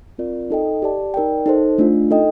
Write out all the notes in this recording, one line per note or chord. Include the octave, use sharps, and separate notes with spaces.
C4 F4 A#4 D5
D#4 A4 D#5 G5
G4 D5 A5
D#4 A#4 D5 G5
D#4 A4 C5
A3 D4 F4
D#4 A4 D#5 G5